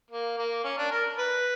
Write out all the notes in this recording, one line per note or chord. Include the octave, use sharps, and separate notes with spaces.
A#3
A#3
C#4
D4
A#4
B4